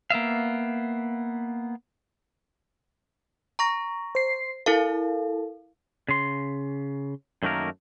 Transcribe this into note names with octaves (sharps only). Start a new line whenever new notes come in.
A#3 B3 E5 F5
A#5 C#6 A#6
C5 C7
E4 A4 A#4 F5
C#3 C6
F#2 D#3 A3 A#3 A#4